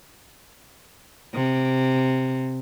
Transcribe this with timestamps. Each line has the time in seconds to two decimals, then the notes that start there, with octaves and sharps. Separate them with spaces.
1.34 C3